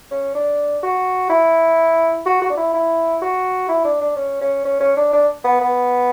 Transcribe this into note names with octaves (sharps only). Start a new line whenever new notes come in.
C#4
D4
F#4
E4
F#4
F#4
D4
E4
E4
F#4
E4
D4
D4
C#4
C#4
C#4
C#4
D4
D4
B3
B3